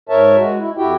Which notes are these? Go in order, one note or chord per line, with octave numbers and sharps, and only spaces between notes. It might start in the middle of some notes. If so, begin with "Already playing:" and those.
G#2 A#4 C#5 E5 A5
G#3 F#4
E4
F2 E4 F#4 G4 G5